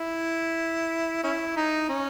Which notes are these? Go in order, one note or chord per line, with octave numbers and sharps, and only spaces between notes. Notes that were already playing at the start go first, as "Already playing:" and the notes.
Already playing: E4
C#4 E4
D#4
C#4